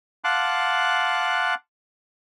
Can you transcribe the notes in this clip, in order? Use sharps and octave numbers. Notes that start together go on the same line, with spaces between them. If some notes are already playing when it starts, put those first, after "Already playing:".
F5 F#5 A5 C6 D6 F#6